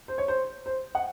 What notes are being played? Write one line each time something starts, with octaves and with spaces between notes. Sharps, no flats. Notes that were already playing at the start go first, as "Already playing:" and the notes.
C5
C#5
C5
C5
F#5